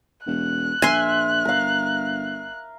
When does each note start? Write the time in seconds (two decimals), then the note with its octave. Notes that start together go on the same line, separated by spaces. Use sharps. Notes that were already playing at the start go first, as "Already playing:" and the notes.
0.26 E1 F#6
0.82 A#1 E5 G#5 C6
1.45 G1 A#4 F5